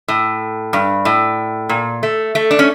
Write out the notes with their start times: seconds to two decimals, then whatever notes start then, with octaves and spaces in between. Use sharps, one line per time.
0.08 A2
0.73 G2
1.05 A2
1.69 A#2
2.03 A3
2.35 A3
2.51 D4
2.59 C#4